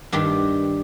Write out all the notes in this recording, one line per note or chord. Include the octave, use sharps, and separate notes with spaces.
G2 D#3 G3 D4